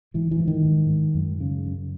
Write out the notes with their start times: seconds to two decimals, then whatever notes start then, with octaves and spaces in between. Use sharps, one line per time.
0.14 G#2 E3
0.31 E3
0.39 G#2
0.48 D#3
0.65 G#2
0.89 G#2
1.15 F#2
1.40 C#3
1.66 F#2